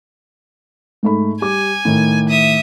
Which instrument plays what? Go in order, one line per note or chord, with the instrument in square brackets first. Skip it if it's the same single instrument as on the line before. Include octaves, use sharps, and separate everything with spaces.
[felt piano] G#2 A3 B5
[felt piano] G3 D6 [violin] G#5
[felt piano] A2 D#3
[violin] E5 D#6